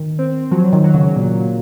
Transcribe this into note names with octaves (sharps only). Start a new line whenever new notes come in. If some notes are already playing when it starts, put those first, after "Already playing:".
Already playing: D#3
C4
F3 F#3
D#3
D#3 F#3
C#3
A#2